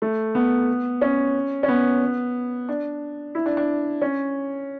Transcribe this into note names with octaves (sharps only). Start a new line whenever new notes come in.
A3
B3
C#4
C#4
B3
D4
E4
D4
D4
C#4